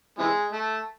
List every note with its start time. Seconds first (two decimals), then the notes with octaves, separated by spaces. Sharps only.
0.19 C3 E3 G#3
0.53 A3